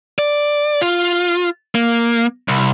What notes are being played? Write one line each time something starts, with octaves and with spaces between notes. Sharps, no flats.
D5
F4
A#3
C2